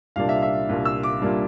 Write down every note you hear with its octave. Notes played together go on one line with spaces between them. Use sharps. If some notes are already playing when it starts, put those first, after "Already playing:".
C2 A#2 G3 A#3 D4 F5
E5
E5
C2 A#2 G3 A#3 D4
E6
D6
A#2 G3 A#3 D4